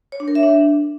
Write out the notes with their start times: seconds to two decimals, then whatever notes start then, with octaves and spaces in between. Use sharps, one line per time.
0.12 C#5
0.20 D4
0.28 A#4
0.35 E5
0.43 D4